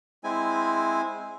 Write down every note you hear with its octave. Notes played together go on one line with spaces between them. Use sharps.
G#3 C4 E4 G#5